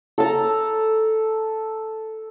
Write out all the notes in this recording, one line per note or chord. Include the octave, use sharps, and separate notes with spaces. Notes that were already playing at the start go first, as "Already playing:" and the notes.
A4 A5 A#5